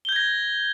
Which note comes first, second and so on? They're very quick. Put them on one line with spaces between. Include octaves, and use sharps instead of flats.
G7 G6 G#6 A#6